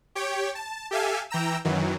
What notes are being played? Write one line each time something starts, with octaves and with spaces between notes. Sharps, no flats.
G4 C#5 G5
A5
G4 A4 E5 F5 G#5
E3 G5 A#5 E6
F#2 D#3 E3 F#3